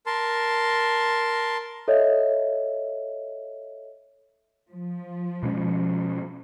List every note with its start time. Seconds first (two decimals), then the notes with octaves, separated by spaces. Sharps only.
0.06 A#4 A5 C6
1.88 A4 C#5 D#5 E5
4.70 F3
5.43 B2 G#3 C#4